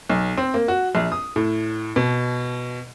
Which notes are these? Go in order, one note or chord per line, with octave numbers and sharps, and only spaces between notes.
B1
C4
A#3
F#4
A#1
D#6
A2
B2